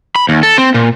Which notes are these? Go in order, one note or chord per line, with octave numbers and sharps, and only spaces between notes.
B5
D#2
A4
C4
A#2